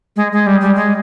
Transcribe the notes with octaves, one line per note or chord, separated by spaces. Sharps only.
G#3
G#3
G3
G3
G#3